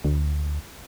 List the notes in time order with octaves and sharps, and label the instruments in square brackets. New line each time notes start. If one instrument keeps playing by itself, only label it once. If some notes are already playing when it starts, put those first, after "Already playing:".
[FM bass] D2